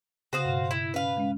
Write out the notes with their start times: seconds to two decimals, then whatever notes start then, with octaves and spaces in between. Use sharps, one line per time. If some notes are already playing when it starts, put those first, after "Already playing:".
0.33 C#3 F#4 C5 F5 D#6
0.45 G2 B2
0.71 E4
0.94 C#4 B4 F5
1.17 G#3 C#4